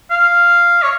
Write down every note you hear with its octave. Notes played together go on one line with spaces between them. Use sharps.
F5
C#5